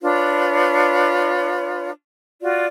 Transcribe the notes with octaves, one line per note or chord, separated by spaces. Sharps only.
D4 F4 B4 C#5
F4 F#4 D5